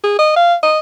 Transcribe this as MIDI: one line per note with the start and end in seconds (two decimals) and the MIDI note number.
0.04 0.16 68
0.19 0.34 75
0.36 0.55 77
0.63 0.79 75